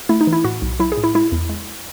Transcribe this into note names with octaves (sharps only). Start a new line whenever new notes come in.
A3 E4
D#4
E3
E4
A2 F#4
B1
F#3 E4
G#4
A2
E4
G#3 E4
E2
G#3